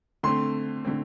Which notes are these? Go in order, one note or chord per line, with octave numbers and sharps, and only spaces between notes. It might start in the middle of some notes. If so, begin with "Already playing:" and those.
D3 A3 C4 C6
D3 A3 C4